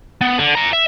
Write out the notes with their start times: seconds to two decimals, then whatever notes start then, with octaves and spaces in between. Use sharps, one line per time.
0.21 B3
0.38 D3
0.55 D5 A#5
0.73 E5